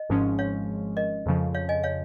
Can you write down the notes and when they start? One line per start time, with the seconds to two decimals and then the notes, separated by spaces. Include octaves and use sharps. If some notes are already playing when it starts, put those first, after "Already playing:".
Already playing: D#5
0.09 G#1 G#2 F3 G#3 C#4
0.39 C#5 F5
0.97 A#4 D#5
1.26 F2 C#3 F3
1.54 C#5 F5
1.69 D#5 G#5
1.83 C#5 F5